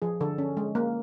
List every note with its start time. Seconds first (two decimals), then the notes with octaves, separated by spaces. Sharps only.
0.02 F3 G#4
0.21 D3 A4
0.38 C#4
0.57 G#3
0.75 A#3